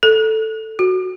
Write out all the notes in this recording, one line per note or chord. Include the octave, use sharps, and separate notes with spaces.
A4
F#4